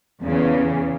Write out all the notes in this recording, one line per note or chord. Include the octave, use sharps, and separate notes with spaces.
E2 C#3 E3